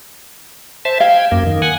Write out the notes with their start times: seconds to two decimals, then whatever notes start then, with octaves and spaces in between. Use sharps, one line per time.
0.85 C5 E5 A5
1.00 F5 G5 G#6
1.32 F#2 A#3
1.46 D#3
1.62 F#5 G#5